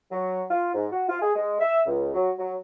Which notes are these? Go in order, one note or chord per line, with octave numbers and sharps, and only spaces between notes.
F#3
F4
G#2
F#4
F4
G#4
G#3
E5
C#2
F#3
F#3